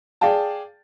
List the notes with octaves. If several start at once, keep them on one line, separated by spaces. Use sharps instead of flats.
G#4 D5 F5 G5 A5